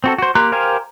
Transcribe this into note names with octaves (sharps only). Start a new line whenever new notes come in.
C4 F#4 A4
F#4 C5
A#3 G4 A#5 C6 F#6
G4 A#4 C5 F5 G#5